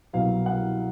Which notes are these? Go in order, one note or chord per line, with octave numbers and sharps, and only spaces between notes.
C2 B2 F#3 F5
F#5